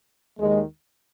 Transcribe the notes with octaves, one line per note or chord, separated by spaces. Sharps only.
D#2 D#3 G#3